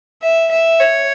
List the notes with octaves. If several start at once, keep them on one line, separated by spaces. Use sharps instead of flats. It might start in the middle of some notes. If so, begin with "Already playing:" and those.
E5
E5
C#5